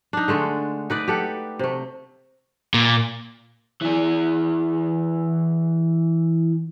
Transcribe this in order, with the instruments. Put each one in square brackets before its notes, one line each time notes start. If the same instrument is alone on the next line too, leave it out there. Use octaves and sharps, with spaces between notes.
[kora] D4 D#4
D3 G#3 A3 A4
D#4 B4 D5
G4 A4 F#5
C3 A3
[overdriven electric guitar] A#2
E3 G#4